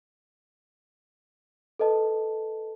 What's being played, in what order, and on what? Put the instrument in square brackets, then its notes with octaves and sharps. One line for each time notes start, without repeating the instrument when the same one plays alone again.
[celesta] A4 B4 D#5 A5